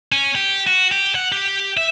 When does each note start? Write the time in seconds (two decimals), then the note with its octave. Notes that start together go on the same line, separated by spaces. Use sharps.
0.12 C#4
0.35 G4
0.67 F#4
0.91 G4
1.15 F#5
1.32 G4
1.77 E5